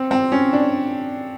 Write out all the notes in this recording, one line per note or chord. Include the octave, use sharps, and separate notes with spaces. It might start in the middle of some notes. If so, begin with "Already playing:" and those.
Already playing: C4
C4
C#4
D4